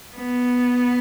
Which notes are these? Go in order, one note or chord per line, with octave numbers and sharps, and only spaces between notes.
B3